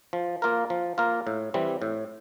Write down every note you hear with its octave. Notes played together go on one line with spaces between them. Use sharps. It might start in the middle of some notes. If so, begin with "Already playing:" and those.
F3
A#3 F4 A#4
F3
A#3 F4 A#4
A2
E3 G3 C4
A2